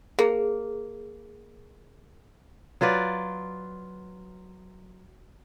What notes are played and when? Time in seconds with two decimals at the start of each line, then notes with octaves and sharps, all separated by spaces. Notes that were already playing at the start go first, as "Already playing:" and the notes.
0.19 A#3 G#4
2.81 F#3 F4 B4 D5